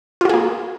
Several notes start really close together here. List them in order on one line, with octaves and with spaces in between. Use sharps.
F4 F#4 G#4 A#3